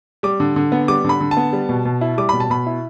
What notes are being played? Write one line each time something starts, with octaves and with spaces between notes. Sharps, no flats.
G3 D6
D3
D3
B3
G3 D6
D3 B5
D3
A5
B3
G3
B2
B2
E4
G3 D6
B2 B5
A5
B2 B5
E4